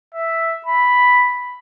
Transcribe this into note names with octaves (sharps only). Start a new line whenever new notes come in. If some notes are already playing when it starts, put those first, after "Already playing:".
E5
B5